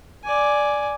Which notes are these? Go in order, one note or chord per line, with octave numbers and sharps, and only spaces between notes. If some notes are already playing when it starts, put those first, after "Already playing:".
D5 G#5